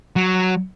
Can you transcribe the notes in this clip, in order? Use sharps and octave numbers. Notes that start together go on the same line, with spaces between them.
F#3